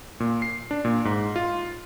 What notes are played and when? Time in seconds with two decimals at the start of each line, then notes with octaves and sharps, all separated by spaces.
0.20 A#2
0.42 C7
0.71 D4
0.85 A#2
1.05 G#2
1.36 F4